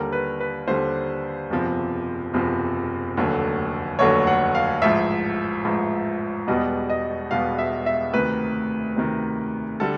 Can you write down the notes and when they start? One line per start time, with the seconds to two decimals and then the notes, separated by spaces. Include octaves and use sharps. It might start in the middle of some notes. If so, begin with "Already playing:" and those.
Already playing: D#2 D3 G3 A#4
0.12 B4
0.40 B4
0.67 D#2 D3 G3 C5
1.50 F#1 E2 C3 F3
2.34 F#1 E2 C3 F3
3.17 F1 D#2 D3 F#3 A3
3.99 F1 D#2 D3 F#3 A3 C#5
4.27 F#5
4.55 F5
4.82 A1 G#2 F3 E5
5.65 A1 G#2 F3
6.48 E1 E2 B2 G3 B3 D#5
6.90 D#5
7.31 E1 E2 B2 G3 B3 F5
7.58 E5
7.86 E5
8.13 D2 C3 D#3 B4
8.97 D2 C3 D#3
9.80 D3 G3 A4